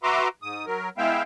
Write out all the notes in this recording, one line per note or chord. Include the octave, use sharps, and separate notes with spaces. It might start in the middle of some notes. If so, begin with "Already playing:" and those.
F#4 B4 E5 A#5 C6 D6
G#2 D#6
F#3 A#4
G#3 B3 E4 E5 F5 G5